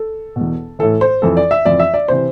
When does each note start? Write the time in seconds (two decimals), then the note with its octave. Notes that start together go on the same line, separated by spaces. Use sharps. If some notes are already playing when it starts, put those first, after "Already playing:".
Already playing: A4
0.36 B2
0.41 E2
0.79 A2 E3 A4
1.01 C5
1.22 F2 E3 A4
1.37 D5
1.51 E5
1.66 F2 E3 D5
1.80 E5
1.94 D5
2.08 C3 E3 C5